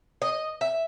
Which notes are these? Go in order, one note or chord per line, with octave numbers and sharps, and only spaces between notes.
D#5
E5